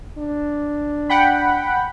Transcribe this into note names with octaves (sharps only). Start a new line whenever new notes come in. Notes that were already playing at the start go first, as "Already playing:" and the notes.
D4
F#5 G5 B5